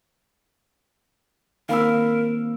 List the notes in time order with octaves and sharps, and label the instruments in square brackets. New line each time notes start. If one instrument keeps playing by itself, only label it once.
[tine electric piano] D#3 A#3 C4 [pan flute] A#4 [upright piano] F5 B5 E6